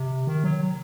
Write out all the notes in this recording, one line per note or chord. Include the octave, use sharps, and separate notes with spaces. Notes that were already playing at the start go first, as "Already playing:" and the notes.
Already playing: C3
D#3
F#3